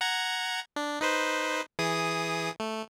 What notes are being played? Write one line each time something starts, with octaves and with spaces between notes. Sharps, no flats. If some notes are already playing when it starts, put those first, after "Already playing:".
F#5 A#5 G#6
D4
D#4 B4 C5
E3 G#4 D#6
A3